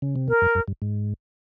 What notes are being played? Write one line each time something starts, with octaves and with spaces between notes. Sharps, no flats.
C#3
C3
B2 A#4
F#2
F#2
G2
G#2